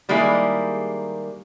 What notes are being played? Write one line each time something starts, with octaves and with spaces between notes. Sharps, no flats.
D#3 G3 G#3 A#3 E4 G#4